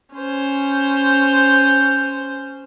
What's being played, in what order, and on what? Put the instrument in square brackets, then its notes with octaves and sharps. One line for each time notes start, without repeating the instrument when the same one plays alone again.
[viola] C#4 C5